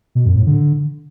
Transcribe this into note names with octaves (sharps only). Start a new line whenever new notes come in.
B2
F#2
A2
D3